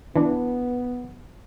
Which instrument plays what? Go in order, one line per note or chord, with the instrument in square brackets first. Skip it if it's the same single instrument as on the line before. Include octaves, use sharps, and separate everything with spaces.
[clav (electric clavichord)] E3 D4 [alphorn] B3